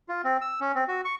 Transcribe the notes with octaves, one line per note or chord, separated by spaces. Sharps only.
F4
C4
E6
C#4
C4
F#4
C#6